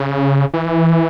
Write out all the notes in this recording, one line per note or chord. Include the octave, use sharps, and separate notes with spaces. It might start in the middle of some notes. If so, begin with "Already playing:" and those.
Already playing: C#3
E3